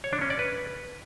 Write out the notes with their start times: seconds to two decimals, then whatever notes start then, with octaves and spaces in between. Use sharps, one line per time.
0.04 C#5
0.13 D4
0.21 C#4
0.30 D5
0.39 B4